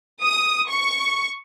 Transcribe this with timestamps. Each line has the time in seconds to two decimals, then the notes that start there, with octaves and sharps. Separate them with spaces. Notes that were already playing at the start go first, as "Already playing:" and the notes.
0.22 D#6
0.69 C#6